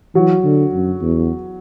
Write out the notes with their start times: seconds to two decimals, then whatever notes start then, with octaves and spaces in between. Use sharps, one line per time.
0.15 E3 F#3
0.44 D3
0.73 F#2
1.02 E2